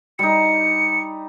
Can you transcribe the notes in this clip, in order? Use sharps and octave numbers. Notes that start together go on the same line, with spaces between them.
G3 D#4 C#7